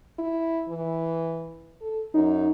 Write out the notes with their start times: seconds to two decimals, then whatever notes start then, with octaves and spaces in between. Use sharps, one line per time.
0.19 E4
0.69 E3
1.82 A4
2.14 F#2 D#4